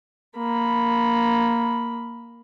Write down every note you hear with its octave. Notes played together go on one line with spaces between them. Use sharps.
A#3 B5